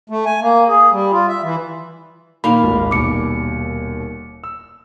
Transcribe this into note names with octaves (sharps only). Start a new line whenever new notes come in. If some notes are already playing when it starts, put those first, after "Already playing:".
A3
G#5
A#3
G#4
G3
F4
E5
E3
A#2 D#3 A#3 F5 B5
D1 G#1 F4
D#1 D#2 B2 D6 C#7
E6